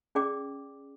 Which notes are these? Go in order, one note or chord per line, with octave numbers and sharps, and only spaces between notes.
C#4 G#4 D5 G5 D6